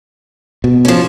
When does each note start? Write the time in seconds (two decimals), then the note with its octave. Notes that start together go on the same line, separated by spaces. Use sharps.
0.64 B2
0.85 F3 C#4